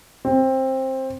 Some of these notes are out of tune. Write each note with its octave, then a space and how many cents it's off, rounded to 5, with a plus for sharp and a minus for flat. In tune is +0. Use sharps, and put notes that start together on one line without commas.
C4 +15